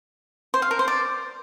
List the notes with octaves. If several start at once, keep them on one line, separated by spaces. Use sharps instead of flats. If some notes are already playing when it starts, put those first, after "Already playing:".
C5
F5
A#4
C5
D5